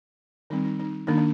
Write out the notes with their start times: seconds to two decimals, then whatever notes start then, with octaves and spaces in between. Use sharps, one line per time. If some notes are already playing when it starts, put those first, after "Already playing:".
0.50 D#3 G3 C4 D#4
0.65 D#4
0.79 D#4
1.07 D#3 A#3 D4 D#4
1.18 D4